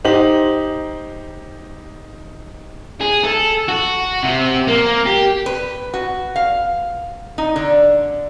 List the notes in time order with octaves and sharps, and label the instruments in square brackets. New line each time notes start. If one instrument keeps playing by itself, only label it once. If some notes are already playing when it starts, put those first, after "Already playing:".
[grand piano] D#4 G4 C5 F#7
[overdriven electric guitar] G#4
A4
F#4
C3
A#3
G4
[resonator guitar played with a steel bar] B4
F#4
F5
D#4
D3